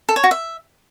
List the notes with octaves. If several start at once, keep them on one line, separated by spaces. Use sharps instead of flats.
A4
C#5
F#4
E5